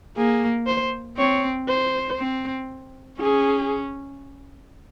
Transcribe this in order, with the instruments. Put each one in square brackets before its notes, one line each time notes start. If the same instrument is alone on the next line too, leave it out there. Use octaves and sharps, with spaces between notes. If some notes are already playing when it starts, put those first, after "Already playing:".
[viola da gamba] A#3 [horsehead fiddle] G#4
[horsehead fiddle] C5
[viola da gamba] C4 [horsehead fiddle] C#5
[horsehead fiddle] C5
[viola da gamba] C4
[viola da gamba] C#4 [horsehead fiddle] G#4